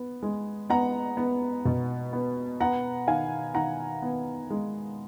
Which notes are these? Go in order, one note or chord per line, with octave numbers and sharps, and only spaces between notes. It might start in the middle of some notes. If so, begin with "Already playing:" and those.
Already playing: B3
G#3
B3 F#5 A#5
B3
B2
B3
B3 F#5 A#5
D#3 F5 G#5
D#3 F#5 A#5
B3
G#3